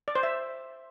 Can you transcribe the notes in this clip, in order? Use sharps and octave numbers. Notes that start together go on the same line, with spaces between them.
D5
C5
E5